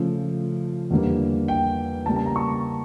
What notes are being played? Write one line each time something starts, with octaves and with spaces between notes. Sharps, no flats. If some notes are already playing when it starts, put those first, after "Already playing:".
Already playing: C#3 F3 A3
E2 D3 G3 A#3
G5
C#3 G3 A#3 A5
A5
A#5
C#6